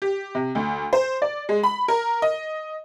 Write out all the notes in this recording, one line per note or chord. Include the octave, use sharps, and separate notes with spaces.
G4
C3
D2
C5
D5
G#3
B5
A#4
D#5